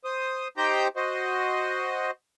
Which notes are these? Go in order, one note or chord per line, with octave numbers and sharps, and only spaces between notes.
C5 D#6
D#4 G4 C5 G5 A#5 G6
F#4 C5 D#5